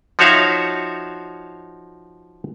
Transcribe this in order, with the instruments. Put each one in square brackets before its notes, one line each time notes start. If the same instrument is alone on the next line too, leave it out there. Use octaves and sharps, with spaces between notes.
[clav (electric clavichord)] F3 D#4 F#4 C#5 E5 F5